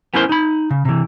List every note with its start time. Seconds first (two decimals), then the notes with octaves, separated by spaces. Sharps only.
0.14 B3 C#4 E4 A#4 C5 C6
0.29 D#4 B5
0.71 C#3
0.85 C3 E3